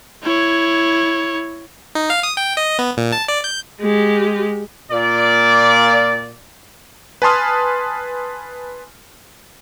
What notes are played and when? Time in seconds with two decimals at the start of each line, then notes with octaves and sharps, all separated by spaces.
0.23 E4 C#5
1.95 D#4
2.10 F5
2.23 D#6
2.37 G5
2.57 D#5
2.79 B3
2.97 A#2
3.12 A5
3.28 D5
3.44 G6
3.81 G#3 G4
4.91 A#2 D5
7.22 B4 G#5 A5 C6 D#6 F6